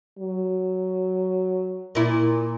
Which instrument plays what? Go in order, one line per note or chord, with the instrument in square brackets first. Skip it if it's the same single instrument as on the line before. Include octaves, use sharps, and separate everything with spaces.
[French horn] F#3
[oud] A#2 E4